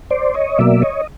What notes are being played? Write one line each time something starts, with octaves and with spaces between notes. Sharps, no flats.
C5 D5
C#5 D#5
B2 F#3 A#3 D5 E5
C#5 D#5